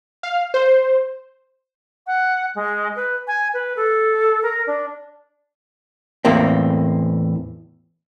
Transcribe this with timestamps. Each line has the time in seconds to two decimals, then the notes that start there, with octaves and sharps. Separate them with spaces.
0.23 F5
0.54 C5
2.07 F#5
2.55 G#3
2.96 B4
3.27 G#5
3.54 B4
3.76 A4
4.43 A#4
4.67 D4
6.25 E2 A2 A#3 C4